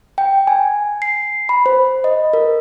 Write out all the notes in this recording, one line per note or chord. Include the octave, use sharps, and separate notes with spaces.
G5
G#5
C7
B5
C5
D#5
A#4